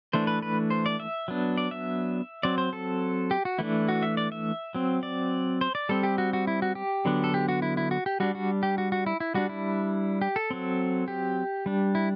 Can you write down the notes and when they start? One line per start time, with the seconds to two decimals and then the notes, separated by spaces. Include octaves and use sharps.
0.13 E3 A3 D4 C5
0.27 B4
0.42 B4
0.70 C5
0.86 D5
1.00 E5
1.28 F#3 B3 D4
1.58 D5
1.71 E5
2.43 F#3 C4 D5
2.58 C5
2.73 A4
3.31 G4
3.45 F#4
3.59 E3 A3 D4 E4
3.89 F#4
4.03 E5
4.17 D5
4.32 E5
4.75 F#3 C4
5.03 D5
5.61 C5
5.75 D5
5.89 G3 C4 A4
6.03 G4
6.18 F#4
6.33 F#4
6.47 E4
6.62 F#4
6.75 G4
7.05 D3 F#3 B3 D4
7.24 A4
7.34 G4
7.49 F#4
7.62 E4
7.77 E4
7.91 F#4
8.06 G4
8.20 G3 D4 F#4
8.35 F#4
8.63 G4
8.78 F#4
8.92 F#4
9.06 E4
9.20 E4
9.34 G3 D4 F#4
9.49 E4
10.21 G4
10.36 A4
10.51 F#3 C4
11.08 G4
11.66 G3 D4
11.95 E4